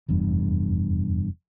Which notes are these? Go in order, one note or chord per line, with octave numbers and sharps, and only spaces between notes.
F1 E2 G2